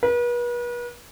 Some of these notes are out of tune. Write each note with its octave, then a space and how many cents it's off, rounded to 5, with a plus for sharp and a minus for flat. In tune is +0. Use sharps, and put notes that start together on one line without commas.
B4 -40